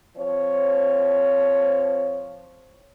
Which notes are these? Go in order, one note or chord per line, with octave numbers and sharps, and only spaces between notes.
F3 C4 C#5